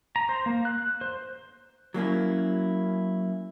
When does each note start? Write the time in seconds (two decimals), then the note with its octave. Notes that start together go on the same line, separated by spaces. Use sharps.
0.16 A#5
0.29 C5
0.46 A#3
0.65 F#6
1.01 C5
1.94 F#3 A#3 C#4 E4